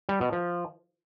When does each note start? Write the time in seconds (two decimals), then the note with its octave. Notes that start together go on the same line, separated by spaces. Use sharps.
0.09 G3
0.21 B2
0.32 F3